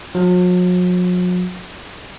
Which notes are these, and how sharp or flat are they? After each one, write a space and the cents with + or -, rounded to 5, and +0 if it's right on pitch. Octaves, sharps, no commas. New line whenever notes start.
F#3 -45